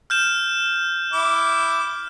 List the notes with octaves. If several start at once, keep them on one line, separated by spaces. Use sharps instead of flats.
F6 G6 E7
E4 D6